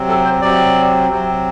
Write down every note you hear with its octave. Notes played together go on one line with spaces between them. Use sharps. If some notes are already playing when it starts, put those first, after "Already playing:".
Already playing: C3 F#3 C4
A4
C5
C3 F#3 C4 D5
C3 F#3 C4